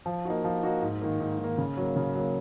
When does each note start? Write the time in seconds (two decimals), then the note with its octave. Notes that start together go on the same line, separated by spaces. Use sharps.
0.06 F3
0.25 A#3 D#4 F#4
0.44 F3
0.63 A#3 D#4 F#4
0.82 G#2
1.01 D#3 A#3
1.20 G#2
1.39 D#3 A#3
1.58 C#3
1.77 F#3 A#3
1.96 C#3
2.15 F#3 A#3